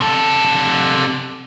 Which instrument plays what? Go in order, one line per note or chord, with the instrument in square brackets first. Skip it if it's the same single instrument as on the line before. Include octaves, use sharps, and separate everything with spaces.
[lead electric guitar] C3 A4